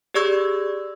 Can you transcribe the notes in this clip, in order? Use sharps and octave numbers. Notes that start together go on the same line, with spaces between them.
G4 G#4 D5 C#6 E6 G#6